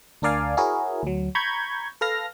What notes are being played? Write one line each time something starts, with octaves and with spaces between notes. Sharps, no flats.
D2 D4 A#4 D5 F5 G#5
E4 F#4 G#4 A#4 C#5
D2 F#3
A#5 B5 C#6 G6 G#6
A4 B4 F5 F6 A#6